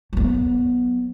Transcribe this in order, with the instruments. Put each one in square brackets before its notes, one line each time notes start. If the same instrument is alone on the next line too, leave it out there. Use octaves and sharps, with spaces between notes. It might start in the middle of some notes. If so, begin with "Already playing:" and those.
[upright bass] F#3 B3